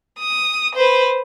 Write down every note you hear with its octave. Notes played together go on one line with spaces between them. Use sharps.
D#6
B4 C5